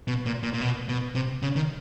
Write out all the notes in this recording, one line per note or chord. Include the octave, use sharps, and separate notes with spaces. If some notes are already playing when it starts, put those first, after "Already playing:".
B2
A#2
A#2
A#2
B2
B2
C3
C#3
D#3